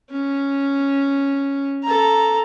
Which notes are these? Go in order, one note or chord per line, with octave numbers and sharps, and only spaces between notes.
C#4
A4 A#5